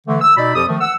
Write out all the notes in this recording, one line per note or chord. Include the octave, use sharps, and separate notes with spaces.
D3 E3 A3
E6
B2 D#4 D5 D#5 B5
F2 F3 G4 A4 D#6
D#3 F3 A3
F#5 E6